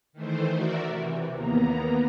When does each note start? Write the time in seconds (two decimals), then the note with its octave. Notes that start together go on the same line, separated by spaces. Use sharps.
0.13 D#3 E3 A3 C5
0.52 F#4 A#4 D5 E5
0.86 C3 E3
1.34 D#2 A#3 B3 A#5